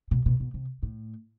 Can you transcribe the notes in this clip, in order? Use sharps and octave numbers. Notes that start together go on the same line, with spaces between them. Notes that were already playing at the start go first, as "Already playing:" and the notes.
B2
B2
B2
C3
A2